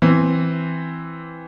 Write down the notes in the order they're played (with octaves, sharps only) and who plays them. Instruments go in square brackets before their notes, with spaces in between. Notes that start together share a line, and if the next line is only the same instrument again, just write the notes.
[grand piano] E3 C4